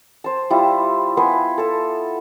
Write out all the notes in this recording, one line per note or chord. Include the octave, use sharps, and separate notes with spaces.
C5 A5
G3 E4 F4
B3 B4 G#5 C6
A4 A5